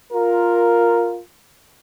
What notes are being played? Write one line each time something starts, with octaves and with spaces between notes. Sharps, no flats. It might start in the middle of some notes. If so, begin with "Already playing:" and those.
F4 A#4